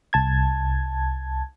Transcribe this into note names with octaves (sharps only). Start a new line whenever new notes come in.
C2 A5 G#6